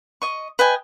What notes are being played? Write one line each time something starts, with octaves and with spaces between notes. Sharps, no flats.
D#5 C#6
B4 D#5 G5 G#5